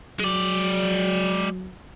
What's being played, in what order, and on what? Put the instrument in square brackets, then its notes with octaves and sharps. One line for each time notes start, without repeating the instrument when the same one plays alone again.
[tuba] F#3 [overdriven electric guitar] G#3 D5